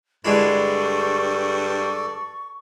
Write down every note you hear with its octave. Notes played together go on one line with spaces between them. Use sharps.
G2 D3 G#3 E4 A4 D5 C#6